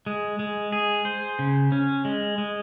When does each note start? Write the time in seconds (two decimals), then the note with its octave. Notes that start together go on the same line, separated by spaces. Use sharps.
0.06 G#3
0.39 G#3
0.72 G#4
1.05 C5
1.39 C#3
1.72 C#4
2.05 G#3
2.38 G#3